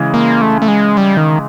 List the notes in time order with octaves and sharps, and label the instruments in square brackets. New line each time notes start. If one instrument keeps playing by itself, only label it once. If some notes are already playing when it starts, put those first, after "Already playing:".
Already playing: [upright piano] C#3 E3 G#3
[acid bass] A#3
A3
A3
G#3
G3
D#3